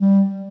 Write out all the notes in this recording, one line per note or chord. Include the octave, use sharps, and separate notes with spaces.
G3